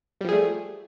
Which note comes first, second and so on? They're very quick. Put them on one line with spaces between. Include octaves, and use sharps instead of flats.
G3 F3 G#4 A3